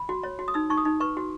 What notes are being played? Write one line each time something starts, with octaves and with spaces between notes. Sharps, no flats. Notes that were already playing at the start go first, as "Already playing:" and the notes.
Already playing: B5
F#4
C#5
F#4
D#6
D#4 E6
D#4 C#6
D#6
D#4
B4 C#6
F#4